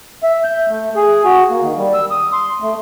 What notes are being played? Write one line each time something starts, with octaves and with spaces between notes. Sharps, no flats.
E5
G6
A3
G#4
F#4
A#3
D#3
G3
E6
D#6
C6
A3